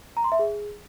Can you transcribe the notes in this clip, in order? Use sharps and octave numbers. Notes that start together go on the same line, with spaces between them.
A#5
C6
E5
G#4